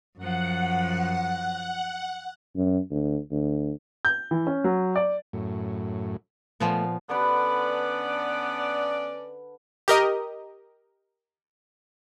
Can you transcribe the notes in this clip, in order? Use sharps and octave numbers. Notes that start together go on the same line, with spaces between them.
F#2 F3 F#5
F#2
D2
D2
G6
E3
C#4
F#3
D5
F#2 A2
A#2 F3 A3 B3
D3 B3 C#4 D4 B4 D5
G4 A#4 D#5